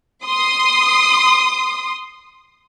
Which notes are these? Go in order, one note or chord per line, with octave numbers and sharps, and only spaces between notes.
C6 D#6